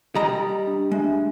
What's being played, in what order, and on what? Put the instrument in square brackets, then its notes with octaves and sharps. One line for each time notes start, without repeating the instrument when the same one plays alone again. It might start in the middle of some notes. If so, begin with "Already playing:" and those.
[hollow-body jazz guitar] G3 A#5 [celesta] D#5 D#6
[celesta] D4
[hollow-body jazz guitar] G#3 [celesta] D4 E5